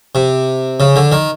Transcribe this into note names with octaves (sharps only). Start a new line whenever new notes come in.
C3
C#3
D3
D#3